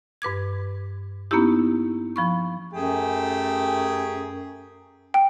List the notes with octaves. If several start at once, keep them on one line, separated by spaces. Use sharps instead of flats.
G2 B4 D6 G#6
A#3 B3 C#4 D#4 E4 G4
F3 B5 C#6
F#2 A3 G4 G#4
G5